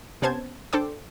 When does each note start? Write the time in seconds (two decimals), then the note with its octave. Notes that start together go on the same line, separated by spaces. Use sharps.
0.22 C3 B3 C#4 C5 A5 G#6
0.73 D4 A4 C5 G5 D6